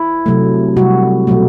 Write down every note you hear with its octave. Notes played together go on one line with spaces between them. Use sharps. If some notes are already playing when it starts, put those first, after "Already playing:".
Already playing: E4
C3 F#3 A3
C3 G3 F#4
B2 F#3 A3